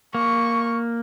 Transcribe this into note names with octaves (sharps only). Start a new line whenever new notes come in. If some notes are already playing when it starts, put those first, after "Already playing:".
A#3 C#6